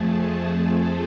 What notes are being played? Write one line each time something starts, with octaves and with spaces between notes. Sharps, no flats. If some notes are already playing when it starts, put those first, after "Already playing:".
Already playing: F2 F3 A3 G#4 A4
A4